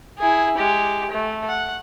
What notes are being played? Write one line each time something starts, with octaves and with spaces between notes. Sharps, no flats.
E4 G#4
G#3 G4
A3
F#5